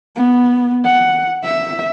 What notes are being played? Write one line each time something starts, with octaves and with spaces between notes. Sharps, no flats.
B3
F#5
E5